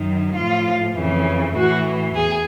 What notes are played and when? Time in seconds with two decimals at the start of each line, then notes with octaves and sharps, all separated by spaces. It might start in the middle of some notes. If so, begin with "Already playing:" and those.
Already playing: F#2 D#3
0.34 A2 F3 F4
0.95 F2 C#3 E3
1.54 A2 E3 F#4
2.15 E2 G#4